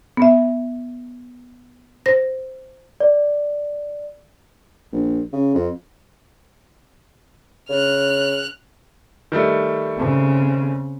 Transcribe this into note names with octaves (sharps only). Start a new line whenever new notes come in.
B3 E5
C5 A#6
D5
A#1
C#3
F2
C#3 F6 F#6
D#3 G3 A3
C#3 C4